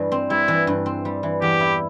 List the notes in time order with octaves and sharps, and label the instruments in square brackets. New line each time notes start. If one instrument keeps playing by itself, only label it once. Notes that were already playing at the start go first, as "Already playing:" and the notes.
Already playing: [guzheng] G2 E3 G3
C4
[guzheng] G3 [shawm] E4
[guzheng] E3
G2
C4
G3
E3
[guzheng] E2 [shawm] G4
[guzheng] E4